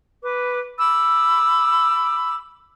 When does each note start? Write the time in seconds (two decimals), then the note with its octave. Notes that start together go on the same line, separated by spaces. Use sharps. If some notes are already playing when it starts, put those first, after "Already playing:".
0.22 B4 D6
0.78 B5 D6 E6